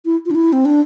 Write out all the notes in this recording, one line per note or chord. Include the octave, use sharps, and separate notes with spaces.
E4
F4
D4
E4
C4
D4